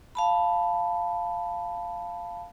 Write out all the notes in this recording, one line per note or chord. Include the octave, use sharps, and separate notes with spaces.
F5 A5 B5